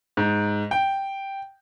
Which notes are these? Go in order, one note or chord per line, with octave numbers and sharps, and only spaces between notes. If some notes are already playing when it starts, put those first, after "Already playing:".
G#2
G5